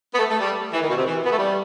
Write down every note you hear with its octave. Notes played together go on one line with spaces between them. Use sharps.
B3
A3
A3
G3
E3
D#3
B2
C3
E3
B3
A3
G3